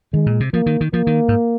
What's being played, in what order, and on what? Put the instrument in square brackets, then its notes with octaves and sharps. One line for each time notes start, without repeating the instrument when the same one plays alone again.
[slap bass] D#3 [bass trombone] G#3
[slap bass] A#2
C3
[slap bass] F3 [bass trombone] A#3
[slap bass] D#3
D#3
[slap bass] F3 [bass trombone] A#3
[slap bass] D#3
G#2